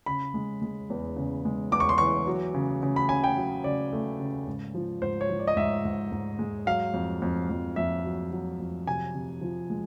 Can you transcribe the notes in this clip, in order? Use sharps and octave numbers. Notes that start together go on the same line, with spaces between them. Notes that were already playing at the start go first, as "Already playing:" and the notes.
C#3 B5
G#3
G#3
E2
C#3
G#3
E2 D6
C#6
C6
E3 C#6
F#3
C#3
C#3
B5
C#3 G#5
G5
F#3
C#3 D5
A3
C#3
G#2
F3
G#2 C5
C#5
F3
D5
D#5
G#2 E5
G#2
G#2
G#3
F#3 F5
F2
F2
F2
F2 E5
F#3
F#3
F2
C3 G#5
C3
F3
G#3